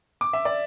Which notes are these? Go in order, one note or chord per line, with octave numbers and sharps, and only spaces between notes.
D6
E5
D5